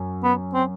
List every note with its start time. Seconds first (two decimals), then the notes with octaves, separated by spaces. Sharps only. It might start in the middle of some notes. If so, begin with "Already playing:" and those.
Already playing: F#2
0.24 B3
0.54 C4